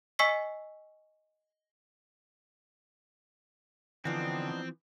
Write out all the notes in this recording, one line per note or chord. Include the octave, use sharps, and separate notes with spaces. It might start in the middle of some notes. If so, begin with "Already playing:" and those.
D#5 G#5 C#6 E6 B6 C7
D3 E3 F3 B3 C4 D4 D#4